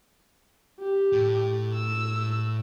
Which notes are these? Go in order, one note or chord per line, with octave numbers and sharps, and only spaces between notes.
G4
A2
E6